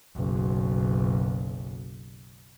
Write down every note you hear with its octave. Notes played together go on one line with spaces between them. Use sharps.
F#1 B1